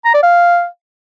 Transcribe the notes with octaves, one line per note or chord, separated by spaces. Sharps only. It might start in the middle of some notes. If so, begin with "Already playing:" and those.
A#5
D5
F5